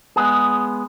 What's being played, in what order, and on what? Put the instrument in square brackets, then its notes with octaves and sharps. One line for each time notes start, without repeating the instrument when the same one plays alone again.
[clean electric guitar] G#3 B3 G#4